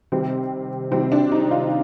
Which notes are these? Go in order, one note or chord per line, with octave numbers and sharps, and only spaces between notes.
C3 D#3 G3 C4
C3 D#3 G3 C4
D4
D#4
F4